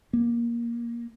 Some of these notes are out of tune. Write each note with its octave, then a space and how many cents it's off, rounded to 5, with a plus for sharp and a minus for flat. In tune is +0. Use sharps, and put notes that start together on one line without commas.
A#3 +15